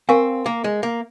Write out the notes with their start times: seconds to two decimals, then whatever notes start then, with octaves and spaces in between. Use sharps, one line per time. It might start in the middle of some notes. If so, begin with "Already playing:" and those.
0.09 C4 A#4 F5 G#5 C#6
0.46 A#3
0.64 G#3
0.83 A#3